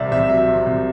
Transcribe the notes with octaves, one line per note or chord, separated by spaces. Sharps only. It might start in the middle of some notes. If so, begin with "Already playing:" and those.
Already playing: C2 C3 D5 E5
C2 E5
F#3 E5
C3
C2